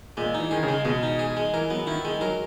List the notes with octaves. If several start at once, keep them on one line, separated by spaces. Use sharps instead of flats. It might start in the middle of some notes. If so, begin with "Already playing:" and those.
A#2 G#3
D#4
E3
D#3 G#4
C#3
G#3
B2 G#3
D#4
G#4
G#3
E3 A#4
F#3 B3
D#3 E4
D#3 G#3
F#3 A#4